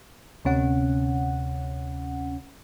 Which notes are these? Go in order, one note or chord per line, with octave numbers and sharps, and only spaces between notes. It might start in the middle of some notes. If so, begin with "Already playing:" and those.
D2 C3 C#4 F#5